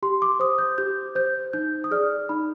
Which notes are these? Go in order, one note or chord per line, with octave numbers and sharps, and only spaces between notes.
G4 C6
D6
C5 D#6
G6
G4 G6
C5 G6
D#4 G6
D#6
G#4 D5 F6
D#4 B5